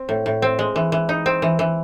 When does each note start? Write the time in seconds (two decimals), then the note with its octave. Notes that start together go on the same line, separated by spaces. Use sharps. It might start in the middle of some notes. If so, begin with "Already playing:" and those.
Already playing: C4
0.09 A2
0.26 A2
0.42 C4
0.59 G#3
0.76 E3
0.92 E3
1.09 D#4
1.26 C4
1.42 E3
1.59 E3